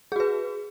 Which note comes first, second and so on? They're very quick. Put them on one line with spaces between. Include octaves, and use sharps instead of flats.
G#4 F#4 B4